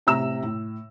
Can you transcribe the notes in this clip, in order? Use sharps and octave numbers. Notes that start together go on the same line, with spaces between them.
A1 C3 E5 A#5 E6 E7
A2